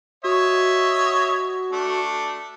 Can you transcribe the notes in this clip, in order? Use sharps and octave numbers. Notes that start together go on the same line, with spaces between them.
F#4 C#5 D#5 E5
A3 D4